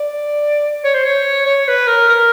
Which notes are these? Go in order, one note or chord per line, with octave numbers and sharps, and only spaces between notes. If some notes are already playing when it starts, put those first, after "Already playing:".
Already playing: D5
C#5
C5
C#5
C#5
B4
A#4
A#4